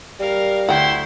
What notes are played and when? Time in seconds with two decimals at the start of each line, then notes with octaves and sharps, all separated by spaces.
0.20 G3 A#4 F5
0.69 D2 E4 F#5 G5 C6 G6